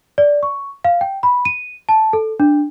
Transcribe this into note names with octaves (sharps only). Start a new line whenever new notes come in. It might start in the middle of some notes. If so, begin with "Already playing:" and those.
D5
C#6
F5
G5
B5
D#7
A5
A4
D4